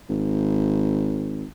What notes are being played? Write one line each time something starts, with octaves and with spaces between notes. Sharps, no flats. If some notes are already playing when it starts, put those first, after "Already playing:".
G#1